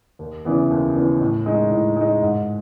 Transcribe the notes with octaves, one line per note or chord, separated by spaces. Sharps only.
D#2
C#3 E3 B3
D#2
C#3 E3 B3
A2
G#3 D#4
A2
G#3 D#4
G#2